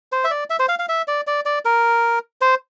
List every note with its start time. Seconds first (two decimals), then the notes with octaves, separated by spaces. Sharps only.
0.12 C5
0.24 E5
0.31 D5
0.50 E5
0.59 C5
0.69 F5
0.79 F5
0.89 E5
1.08 D5
1.27 D5
1.45 D5
1.65 A#4
2.41 C5